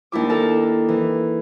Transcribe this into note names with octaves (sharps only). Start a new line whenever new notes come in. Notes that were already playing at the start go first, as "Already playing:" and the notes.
D#2 D4 E4 D6
A4 A#4 A5
E3